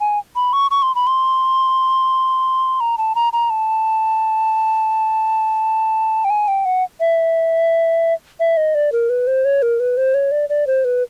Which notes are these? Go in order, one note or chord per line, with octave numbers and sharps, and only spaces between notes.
G#5
B5
C#6
C#6
C6
B5
C6
A#5
A5
A#5
A#5
A5
G5
G#5
G5
F#5
E5
E5
D#5
D5
A#4
B4
C5
C#5
A#4
B4
C5
C#5
D5
D5
C5
B4